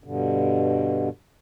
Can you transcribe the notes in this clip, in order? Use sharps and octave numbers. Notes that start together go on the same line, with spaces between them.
G2 B2 D3